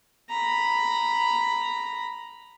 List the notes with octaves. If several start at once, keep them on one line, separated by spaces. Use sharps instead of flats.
A#5 B5